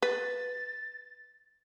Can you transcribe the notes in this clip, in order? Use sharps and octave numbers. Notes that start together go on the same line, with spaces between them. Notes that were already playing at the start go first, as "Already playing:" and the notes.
B4 A6